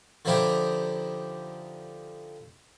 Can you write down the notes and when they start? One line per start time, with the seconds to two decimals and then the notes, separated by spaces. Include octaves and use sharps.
0.25 D3 F3 D#4 E4 G4